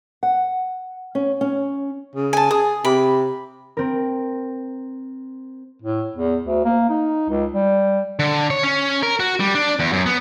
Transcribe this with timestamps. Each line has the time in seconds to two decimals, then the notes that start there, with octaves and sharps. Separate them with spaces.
0.23 F#5
1.15 C#4
1.41 C#4
2.16 C#3
2.33 G#5 A5
2.51 G#4 D#6
2.85 C3 B5 D6
3.77 C4 A#4
5.82 A2
6.16 E2
6.44 D2
6.64 A#3
6.89 D#4
7.30 C#2
7.53 G3
8.19 D3
8.50 C#5
8.63 C#4
9.03 A#4
9.20 F#4
9.40 G3
9.55 D4
9.79 E2
9.93 F#2
10.06 B3